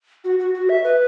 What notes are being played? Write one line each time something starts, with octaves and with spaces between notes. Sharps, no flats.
F#4
F#4
F#4
E5
B4